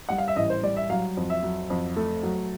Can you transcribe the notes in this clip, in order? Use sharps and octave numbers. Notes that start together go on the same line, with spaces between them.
G3 F#5
F5
E5
A1 D#5
C5
G3 D5
E5
F#3 F5
F2
E5
F#3
F2
A3
F#3